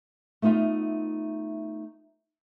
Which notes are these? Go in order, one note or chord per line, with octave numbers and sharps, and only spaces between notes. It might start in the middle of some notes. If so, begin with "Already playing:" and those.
A3 B3 D#4 F4 E5